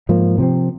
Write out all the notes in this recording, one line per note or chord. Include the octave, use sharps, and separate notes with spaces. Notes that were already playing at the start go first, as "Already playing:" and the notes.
G#2 F3 A#3
C3 F3 C4